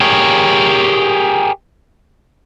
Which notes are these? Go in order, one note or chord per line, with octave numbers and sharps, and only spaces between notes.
G4 G#4 A#4 C#5